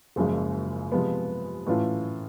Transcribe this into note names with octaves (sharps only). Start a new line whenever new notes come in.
F#1 F#2 C#3 F3 G#3
C3 F3 G#3 B3
A2 E3 A3 C#4 F4